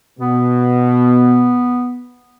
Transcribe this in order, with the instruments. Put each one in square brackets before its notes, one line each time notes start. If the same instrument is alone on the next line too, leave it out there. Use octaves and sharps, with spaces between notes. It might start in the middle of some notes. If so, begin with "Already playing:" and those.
[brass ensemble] B2 [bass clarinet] B3